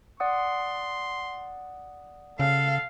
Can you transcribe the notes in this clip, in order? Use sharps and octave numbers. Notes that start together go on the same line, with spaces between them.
D5 F#5 C6 D#6
C#3 A4 F5